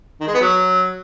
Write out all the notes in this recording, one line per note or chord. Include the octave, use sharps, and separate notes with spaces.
D#3
G#3
B3
F#3